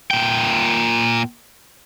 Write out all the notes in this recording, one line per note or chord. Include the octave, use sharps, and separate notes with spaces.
A#2 G5